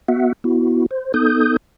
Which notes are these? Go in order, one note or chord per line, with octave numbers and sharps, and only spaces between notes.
B3 F#4 E5 F#5
B3 E4 F#4
C5
B3 D#4 A4 D#6 G6